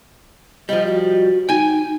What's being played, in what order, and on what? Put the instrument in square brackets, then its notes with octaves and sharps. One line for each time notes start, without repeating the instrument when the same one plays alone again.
[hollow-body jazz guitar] F3 G3 [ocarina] D#5
[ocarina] F#4
[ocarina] D#4 [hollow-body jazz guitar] G5 G#5